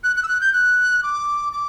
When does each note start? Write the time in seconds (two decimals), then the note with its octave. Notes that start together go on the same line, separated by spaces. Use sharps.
0.04 F#6
0.16 F#6
0.23 E6
0.28 F#6
0.41 G6
0.53 F#6
1.03 D6
1.53 D6